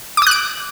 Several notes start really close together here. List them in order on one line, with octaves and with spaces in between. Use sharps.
D6 D#6 F#6 D7